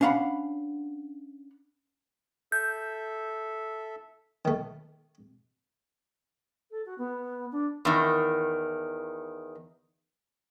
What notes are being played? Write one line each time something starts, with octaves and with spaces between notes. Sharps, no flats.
C#4 D4 F5 F#5 B5
A4 E5 G6
D#3 A3
A4
F#4
B3
D4
E2 D#3